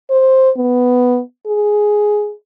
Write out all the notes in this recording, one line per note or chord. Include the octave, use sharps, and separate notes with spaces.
C5
B3
G#4